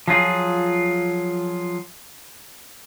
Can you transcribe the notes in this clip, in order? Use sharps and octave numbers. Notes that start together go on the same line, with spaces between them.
F3 F#3 F4 G#4